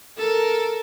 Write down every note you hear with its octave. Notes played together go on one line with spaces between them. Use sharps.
A4 A#4